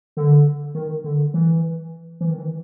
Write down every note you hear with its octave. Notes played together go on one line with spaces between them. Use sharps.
D3
D#3
D3
E3
E3
D#3
E3